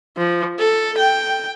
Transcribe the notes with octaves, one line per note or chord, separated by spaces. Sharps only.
F3
A4
G5